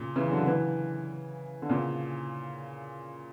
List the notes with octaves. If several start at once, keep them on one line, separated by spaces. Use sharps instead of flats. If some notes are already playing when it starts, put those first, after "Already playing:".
Already playing: A#2 C#3
C#3 E3
D3 F#3
C#3 E3
D3
A#2 C#3